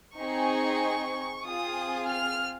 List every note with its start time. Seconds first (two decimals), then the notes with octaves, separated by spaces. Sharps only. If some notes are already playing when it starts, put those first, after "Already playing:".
0.17 C4 D#4 G#4 C#6
1.44 C4 F4 G#4 D#6
2.07 F6